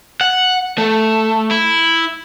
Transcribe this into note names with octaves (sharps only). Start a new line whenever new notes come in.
F#5
A3
E4